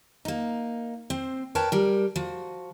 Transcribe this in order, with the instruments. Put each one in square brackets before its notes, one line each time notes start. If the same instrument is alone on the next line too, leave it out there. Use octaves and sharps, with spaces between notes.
[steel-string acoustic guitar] A#3 D#4
C4 C5
A#4 B4 C#5 G5 A5
G3 A#4
F3 F#4